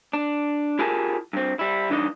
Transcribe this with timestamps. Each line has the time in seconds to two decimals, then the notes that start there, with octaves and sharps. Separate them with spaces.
0.13 D4
0.79 E4 F4 G4 G#4 A#4 A5
1.33 G2 C4
1.59 G3 E4
1.90 G2 E3 D4 D#4 D#5